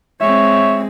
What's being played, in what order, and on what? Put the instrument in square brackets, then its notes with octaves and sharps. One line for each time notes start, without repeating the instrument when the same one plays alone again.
[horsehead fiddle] G#3 C4 [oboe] C#5 [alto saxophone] E5